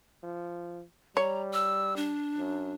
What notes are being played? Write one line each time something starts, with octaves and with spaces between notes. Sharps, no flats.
F3
G3 C#5 A#5
E6
D4
F#2